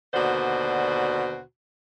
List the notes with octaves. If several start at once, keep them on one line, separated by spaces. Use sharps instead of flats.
D#2 B2 D3 F#4 C5 D5